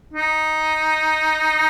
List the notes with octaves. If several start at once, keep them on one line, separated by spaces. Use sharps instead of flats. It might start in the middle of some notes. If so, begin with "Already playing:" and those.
D#4